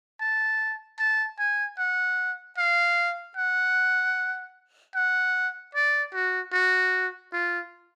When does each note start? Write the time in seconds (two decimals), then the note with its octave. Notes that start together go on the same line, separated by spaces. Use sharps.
0.20 A5
0.99 A5
1.39 G#5
1.78 F#5
2.58 F5
3.37 F#5
4.95 F#5
5.75 D5
6.13 F#4
6.53 F#4
7.33 F4